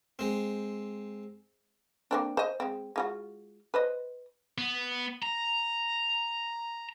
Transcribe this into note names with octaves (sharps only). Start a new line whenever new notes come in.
G#3 C4
A#3 C4 D4
C5 D#5
G#3 C4
G#3 F4 F#4
B4 C5 D#5
B3
A#5